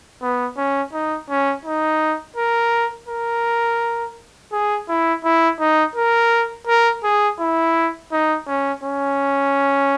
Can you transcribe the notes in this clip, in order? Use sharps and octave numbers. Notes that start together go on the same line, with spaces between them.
B3
C#4
D#4
C#4
D#4
A#4
A#4
G#4
E4
E4
D#4
A#4
A#4
G#4
E4
D#4
C#4
C#4